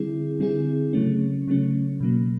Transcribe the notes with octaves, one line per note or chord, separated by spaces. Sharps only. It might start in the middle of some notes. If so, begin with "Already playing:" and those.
Already playing: D3 G3 C4 E4 G#4
D3 G3 C4 E4 G#4
C#3 F#3 A3 C#4
C#3 F#3 A3 C#4
B2 F#3 A#3